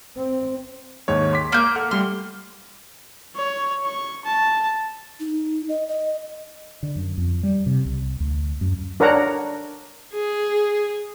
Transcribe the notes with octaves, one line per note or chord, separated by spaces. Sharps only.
C4
D#2 G#2 C#5
C6 D6 B6
A#3 G6
A4 F#5 F6
G3 A3 C6 F6
C#5
C#6
A5
D#4
D#5
D#5
D3
F#2
F2
G3
C3
C2
D2
F#2
D4 A#4 C#5 F#5 A#5
G#4